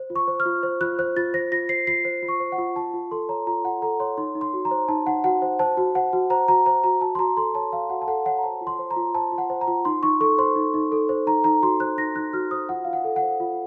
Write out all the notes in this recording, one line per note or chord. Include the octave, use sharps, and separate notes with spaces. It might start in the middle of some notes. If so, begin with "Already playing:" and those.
Already playing: C5
F4
C#6
C5
F6
F4
C5
F4 F#6
C5 F#6
F4 A6
C5 A#6
F4 A#6
C5 C7
F4 C7
C5
F4
C#6
C5
F#5
F4
F4 A5
F4
A4 C6
C#5 A#5
F4 A#5
F4 F#5
A4 A#5
C#5 C6
D#4 C6
D#4
C6
F#4
A#5
C5
D#4 A5
D#4 F#5
F#4 F#5
C5
C5 A5
F#4
C5 F#5
F#4
C5 A#5
F#4 A#5
C5 A#5
F#4 A#5
F#4 A5
C6
F#4 A#5
A4 C6
C#5 A5
F#4 F5
F#4 F#5
A5
A4 F#5
C#5 F#5
A#5
C5 A5
F4
C6
C5
A#5
F4
C5 A5
F4
F#5
C5
A#5
F4
D#4 C6
D#4 C#6
A4 C#6
C5 C6
D#4
D#4
A4
C5
D#4 A#5
D#4 A#5
F#4 C6
C5 F#6
D#4 A#6
D#4 F#6
F#4 F6
C5 D#6
F4 F#5
F4 F5
F#5
A4
F#5
C5
F4